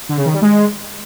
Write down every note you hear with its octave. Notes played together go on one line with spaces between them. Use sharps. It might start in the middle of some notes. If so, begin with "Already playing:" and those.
D3
C#3
D#3
G3
G#3